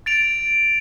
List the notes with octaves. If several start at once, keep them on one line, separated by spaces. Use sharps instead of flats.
A6 D7 F7